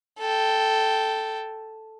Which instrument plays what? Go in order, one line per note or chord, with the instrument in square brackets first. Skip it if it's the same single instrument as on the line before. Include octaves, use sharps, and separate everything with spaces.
[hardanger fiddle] A4 G5